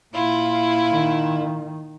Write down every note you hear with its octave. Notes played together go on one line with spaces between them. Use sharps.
A#2 E4 F4
D#3